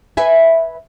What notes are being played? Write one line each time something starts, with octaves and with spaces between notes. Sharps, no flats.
B4 E5 G#5